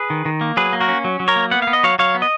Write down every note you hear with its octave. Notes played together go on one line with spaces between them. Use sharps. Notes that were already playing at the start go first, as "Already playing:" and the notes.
Already playing: G#4 B4
D#3
D#3
A#3
F#3 G#4 B4
A#3
F#4 A#4
C#4
F#3
F#3
A#4 C#5
A#3
B3 F#5
B3 F5
D#5
F#3 C#5 F5
F#3 C#5 F5
B3
D#5